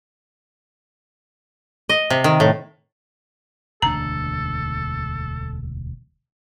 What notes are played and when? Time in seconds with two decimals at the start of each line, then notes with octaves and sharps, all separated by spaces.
1.89 D#5
2.10 C3
2.24 D#3
2.40 A2
3.82 E1 D2 D4 A4 A#5